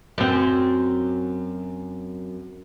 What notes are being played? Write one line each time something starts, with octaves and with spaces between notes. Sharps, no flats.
F#2 C4